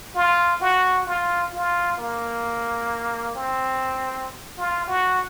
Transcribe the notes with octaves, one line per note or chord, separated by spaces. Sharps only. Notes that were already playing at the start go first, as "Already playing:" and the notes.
F4
F#4
F4
F4
A#3
C4
F4
F#4